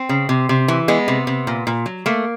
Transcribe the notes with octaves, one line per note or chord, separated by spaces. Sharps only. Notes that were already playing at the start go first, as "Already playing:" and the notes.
Already playing: C4
C#3
C3
C3
E3
G#3 B3
C3
C3
A#2
A#2
F#3
A3 A#3